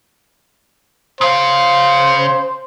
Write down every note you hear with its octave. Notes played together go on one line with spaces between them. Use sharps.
C#3 C5 F5